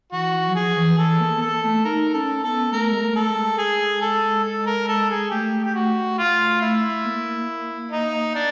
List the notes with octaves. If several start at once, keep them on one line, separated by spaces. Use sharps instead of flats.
E3 F#4
E3
F#3
F3 G#4
E3
E3 A4
A#3
B3
A#3 A4
A3
D#4 A#4
C#4 A4
B3 A4
A3 A#4
G#3
A3
A4
G#3
G#4
A4
A4
A#4
A4
G#4
A3 G4
G4
F#4
F4
E4
A#3
D#4
D4